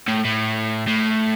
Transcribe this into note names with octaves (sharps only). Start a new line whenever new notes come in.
A2
A2
A2